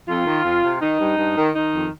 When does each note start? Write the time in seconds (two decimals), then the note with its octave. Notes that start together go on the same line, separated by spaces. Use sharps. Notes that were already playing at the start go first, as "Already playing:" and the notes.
0.08 F2 F4
0.26 D#3
0.45 F2
0.63 C3
0.81 D#3 D#4
1.00 G2
1.18 G2
1.37 D#3
1.55 D#3 D#4
1.74 F2